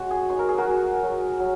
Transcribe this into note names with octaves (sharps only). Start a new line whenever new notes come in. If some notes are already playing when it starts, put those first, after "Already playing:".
Already playing: G#3 C#4 F#4
G#4
D#4 C#5
A#4
G#4
F#4 A#4
F#3
F#3
F#3